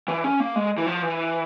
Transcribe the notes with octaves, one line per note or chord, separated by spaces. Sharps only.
E3
C#4
A#3
G#3
E3
F3
E3